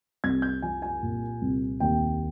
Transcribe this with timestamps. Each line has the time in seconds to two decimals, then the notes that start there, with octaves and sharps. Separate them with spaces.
0.24 C2 G#6
0.42 G6
0.62 F3 G#5
0.82 G#5
1.03 A#2
1.42 C2
1.80 D#2 G5